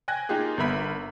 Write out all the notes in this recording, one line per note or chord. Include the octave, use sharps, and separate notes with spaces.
G5 G#5 F#6 G#6 A#6
A#3 D#4 F4 G4 G#4
G1 B3 A#4 E5 B5 B6